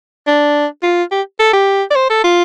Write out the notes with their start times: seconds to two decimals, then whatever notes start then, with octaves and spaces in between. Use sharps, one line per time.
0.27 D4
0.83 F4
1.12 G4
1.40 A4
1.53 G4
1.91 D5
1.96 C5
2.10 A4
2.24 F4